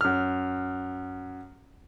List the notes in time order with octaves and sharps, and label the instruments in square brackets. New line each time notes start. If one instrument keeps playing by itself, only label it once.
[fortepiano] F#2 F6